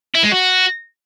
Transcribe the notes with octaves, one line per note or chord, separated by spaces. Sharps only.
E4
G#3
F#4